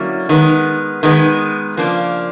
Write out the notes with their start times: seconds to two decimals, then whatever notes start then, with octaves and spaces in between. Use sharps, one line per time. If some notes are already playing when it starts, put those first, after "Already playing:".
Already playing: D3 F#3 A#3 C#4 E4
0.29 D#3 G#3 B3
1.03 D#3 G#3 B3
1.77 C#3 F3 A#3 D4